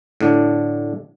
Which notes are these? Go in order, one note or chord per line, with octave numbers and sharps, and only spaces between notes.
A2 D3 D4